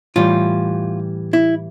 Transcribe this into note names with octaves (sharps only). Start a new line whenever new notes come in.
A2 E3 G3 F4
E4